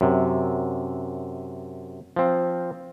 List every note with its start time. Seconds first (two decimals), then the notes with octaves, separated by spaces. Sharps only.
0.01 F#2 C3
2.16 F3 C4